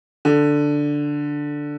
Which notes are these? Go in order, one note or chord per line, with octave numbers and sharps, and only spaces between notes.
D3